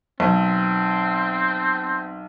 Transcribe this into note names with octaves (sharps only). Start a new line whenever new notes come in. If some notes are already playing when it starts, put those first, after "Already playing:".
B1 C4